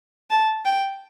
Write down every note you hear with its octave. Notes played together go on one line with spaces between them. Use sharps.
A5
G5